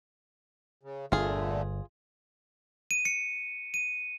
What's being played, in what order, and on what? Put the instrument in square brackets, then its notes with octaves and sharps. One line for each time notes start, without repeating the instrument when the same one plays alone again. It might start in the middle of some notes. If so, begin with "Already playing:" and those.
[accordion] C#3
[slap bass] G1 [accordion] A#2 D3 A3 [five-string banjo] F4 G#4
[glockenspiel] D#7
C#7
D#7